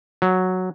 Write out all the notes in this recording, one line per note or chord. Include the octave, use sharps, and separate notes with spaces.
F#3